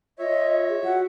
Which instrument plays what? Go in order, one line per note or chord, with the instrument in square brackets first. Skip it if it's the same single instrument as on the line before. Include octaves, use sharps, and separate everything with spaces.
[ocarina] F4 [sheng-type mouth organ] C#5 E5 [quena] D#5
[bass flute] G#4
[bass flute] F#4 [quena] F#5